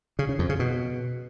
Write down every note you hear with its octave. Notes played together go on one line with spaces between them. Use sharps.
C#3
C#3
F2
C#3
B2